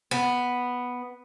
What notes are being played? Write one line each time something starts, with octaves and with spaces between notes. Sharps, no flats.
B3